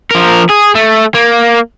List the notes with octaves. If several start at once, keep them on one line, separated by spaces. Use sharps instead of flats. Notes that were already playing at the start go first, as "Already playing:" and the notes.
F3 A#4
G#4
A3
A#3